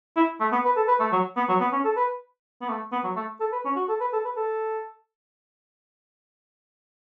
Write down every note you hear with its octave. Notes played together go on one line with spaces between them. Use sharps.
E4
A3
B3
B4
A4
B4
A3
F#3
B3
F#3
B3
C#4
A4
B4
B3
A3
B3
F#3
A3
A4
B4
C#4
F#4
A4
B4
A4
B4
A4